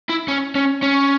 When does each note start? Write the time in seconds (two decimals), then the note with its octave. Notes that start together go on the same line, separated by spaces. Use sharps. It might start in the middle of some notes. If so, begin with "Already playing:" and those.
0.10 E4
0.28 C#4
0.56 C#4
0.83 C#4